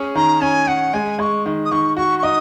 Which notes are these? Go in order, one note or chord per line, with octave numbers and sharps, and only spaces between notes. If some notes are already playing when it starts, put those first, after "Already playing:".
Already playing: C#4 G#4
D#3 A#5
C#4 G#5
C#4 F#5
G#3 G#5
G#3 C#6
D#3
D#6
D#3 C#6
F#4 C#6
C#6
D#4 D#6